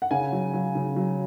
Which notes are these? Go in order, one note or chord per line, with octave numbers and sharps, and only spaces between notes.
F#5
C#3 G#5
F#3
F#3
C#3
F#3